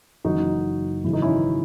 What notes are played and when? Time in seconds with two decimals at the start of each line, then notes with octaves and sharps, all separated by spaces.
0.25 F#1 F#2 C#3 E3 D#4 F#4
1.04 G#1 F#2 C#3 E3 E4
1.13 D#4
1.22 C#4 E4